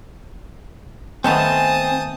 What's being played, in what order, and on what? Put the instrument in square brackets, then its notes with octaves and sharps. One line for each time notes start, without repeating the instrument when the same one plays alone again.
[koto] D#3 A3 B3 [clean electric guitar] C4 [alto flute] G#5 [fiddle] A5 D#6